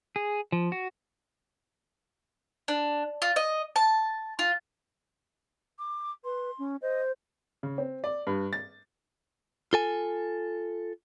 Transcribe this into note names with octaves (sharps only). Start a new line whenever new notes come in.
G#4
F3
F#4
D4
F4
D#5
A5
F4
D6
B4 C6
C#4
C5 D#5
C#3
C4
D5
G2
A6
F4 A4 G#5